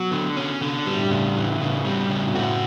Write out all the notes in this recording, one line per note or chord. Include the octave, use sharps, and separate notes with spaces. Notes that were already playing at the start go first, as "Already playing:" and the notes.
Already playing: B2 F#3
D3
C#4
D3
B2 G3
A2
G2
A2 C#3
E3
C#3
G3
C#3
B2
A2 F#4